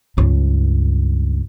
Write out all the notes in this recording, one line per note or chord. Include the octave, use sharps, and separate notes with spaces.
C#2 G2